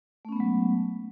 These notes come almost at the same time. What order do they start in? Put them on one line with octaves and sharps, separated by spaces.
A3 C#4 B3 G#3 F#3